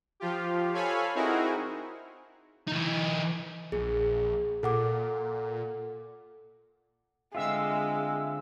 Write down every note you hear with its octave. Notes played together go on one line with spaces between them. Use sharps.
F3 F4 G4
A4 C#5 F5 G#5 B5
C4 D#4 E4 F#4 G#4 A#4
E3 D#4
A#1 G#4
A#2 A4 F#5 D6
D3 G#3 C4 F4 E5 F5 E6